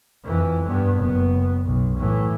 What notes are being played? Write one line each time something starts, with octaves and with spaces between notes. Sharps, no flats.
F2 E3
G2 B3
F#1 B3
B1
A2 E3